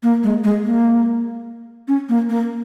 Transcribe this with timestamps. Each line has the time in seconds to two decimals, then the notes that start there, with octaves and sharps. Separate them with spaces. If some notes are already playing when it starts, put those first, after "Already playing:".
0.03 A#3
0.23 G#3
0.44 G#3
0.64 A#3
1.88 C#4
2.09 A#3
2.29 A#3